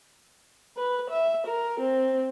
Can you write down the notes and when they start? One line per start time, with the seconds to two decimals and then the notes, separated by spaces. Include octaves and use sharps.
0.77 B4
1.10 E5
1.47 A#4
1.80 C4